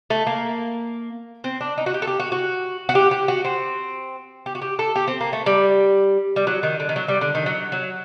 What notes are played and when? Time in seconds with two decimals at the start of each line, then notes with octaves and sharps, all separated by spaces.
0.10 A3
0.27 A#3
1.44 C4
1.61 D4
1.78 D#4
1.86 F#4
1.94 G4
2.02 A4
2.07 G4
2.20 F#4
2.32 F#4
2.89 F#4
2.95 G4
3.11 G4
3.28 F#4
3.45 C4
4.46 G4
4.55 F#4
4.62 G4
4.79 A4
4.96 G4
5.08 C4
5.21 A#3
5.33 A3
5.46 G3
6.36 G3
6.47 F#3
6.63 D#3
6.80 D3
6.89 D#3
6.96 F#3
7.08 G3
7.21 D3
7.35 D#3
7.46 F#3
7.72 F#3